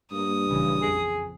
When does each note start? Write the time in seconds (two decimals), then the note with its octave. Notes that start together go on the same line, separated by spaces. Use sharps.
0.12 G2 A#3 D#6
0.49 A#1 C#3 E3
0.82 F2 G#4